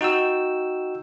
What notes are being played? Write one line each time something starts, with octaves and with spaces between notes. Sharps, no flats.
D#4 F#4 G5 E6